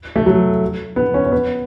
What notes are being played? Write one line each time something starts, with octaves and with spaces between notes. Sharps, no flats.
A3
F#3
B3
C#4
C#4
B3